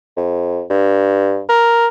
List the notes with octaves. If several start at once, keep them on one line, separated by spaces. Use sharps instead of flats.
F2
G2
A#4